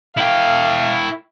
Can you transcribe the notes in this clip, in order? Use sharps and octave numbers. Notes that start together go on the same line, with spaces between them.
E4 F5 G5